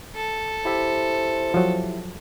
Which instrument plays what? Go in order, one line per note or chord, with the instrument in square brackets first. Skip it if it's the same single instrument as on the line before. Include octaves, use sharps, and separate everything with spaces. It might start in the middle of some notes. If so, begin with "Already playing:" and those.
[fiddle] A4
[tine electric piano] E4 G4 E5 [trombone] C5
[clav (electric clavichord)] F3 F#3